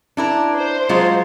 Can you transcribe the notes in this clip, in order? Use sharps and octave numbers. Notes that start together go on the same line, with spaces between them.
D4 E4 A#4
C5
F#3 G#3 F4